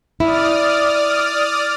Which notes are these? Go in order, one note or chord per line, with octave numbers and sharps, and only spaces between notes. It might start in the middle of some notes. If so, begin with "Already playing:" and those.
E4 D5 D#6 F6